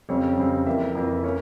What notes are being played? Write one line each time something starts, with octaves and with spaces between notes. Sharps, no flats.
F2 C#3 G3 C4 C#5
F2 C#3 G3 C4
F2 E3 A#3 E5
F2 E3 A#3
A#3 C#4 C#5